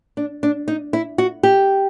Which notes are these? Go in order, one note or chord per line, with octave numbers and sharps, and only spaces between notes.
D4
D4
D#4
E4
F#4
G4